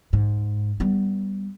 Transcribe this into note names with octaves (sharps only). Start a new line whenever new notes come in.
G#2
G3 B3